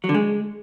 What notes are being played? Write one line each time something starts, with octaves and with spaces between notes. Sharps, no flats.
F#3
D3
G#3